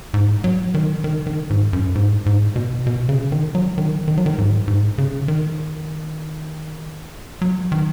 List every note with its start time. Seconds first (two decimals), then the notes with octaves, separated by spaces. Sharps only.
0.14 G#2
0.44 F#3
0.74 D#3
1.04 D#3
1.27 D#3
1.50 G#2
1.73 F#2
1.95 G#2
2.26 G#2
2.56 B2
2.87 B2
3.09 C#3
3.32 D#3
3.55 F#3
3.78 D#3
4.08 D#3
4.18 F#3
4.26 D#3
4.38 G#2
4.68 G#2
4.98 C#3
5.28 D#3
7.42 F#3
7.72 D#3